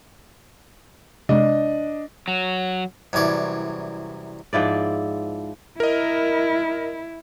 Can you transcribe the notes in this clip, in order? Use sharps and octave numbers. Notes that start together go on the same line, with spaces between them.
C3 G#3 D4 D#5
F#3
C2 F#2 E3 C#5 D5
G#2 F3 E4 D5
E4 A#4 D#5